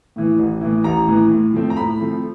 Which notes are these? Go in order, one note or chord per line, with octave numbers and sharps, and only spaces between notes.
A2 E3
A1
A2 E3
A1 A#5
A2 E3
A2
F3 A3 C4
A#5
A2 B5
F3 A3 C4